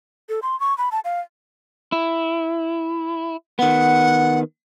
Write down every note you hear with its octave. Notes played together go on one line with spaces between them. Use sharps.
A4
C6
C#6
B5
A5
F5
E4
D#3 B3 F#5